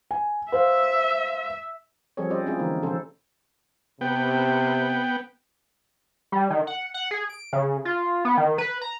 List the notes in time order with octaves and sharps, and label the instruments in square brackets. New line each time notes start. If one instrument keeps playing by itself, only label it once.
[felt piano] G#5
[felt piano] B4 C5 F5 [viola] E5
[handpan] F3 G3 C4 G#4 A4 C#5
G3 C#4 C5 D5 D#5
G#3 C4 C#4 E4 F4 G#4
D3 E3 A#3 D#4
C3 F3 C#4 A4 C5
[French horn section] C3 [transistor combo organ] B3 G5
[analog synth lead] G3
D#3
F#5
F#5
G#4
D7
C#3
F4
B3
D#3
B4
A#5